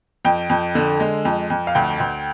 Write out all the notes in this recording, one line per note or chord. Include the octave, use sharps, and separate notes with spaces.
F2 G5
F2
D3
G#3
F2
F2
F5
D2 G5
D2